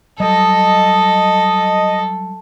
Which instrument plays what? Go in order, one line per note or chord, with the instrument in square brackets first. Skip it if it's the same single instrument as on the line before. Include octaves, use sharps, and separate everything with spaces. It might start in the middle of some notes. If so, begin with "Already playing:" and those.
[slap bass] F#3 G3 [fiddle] A4 [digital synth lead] D#5